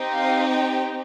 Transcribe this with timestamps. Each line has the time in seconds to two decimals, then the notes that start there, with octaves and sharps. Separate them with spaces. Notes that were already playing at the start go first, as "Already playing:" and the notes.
Already playing: C4 D#4 G4
0.14 F5
0.49 G5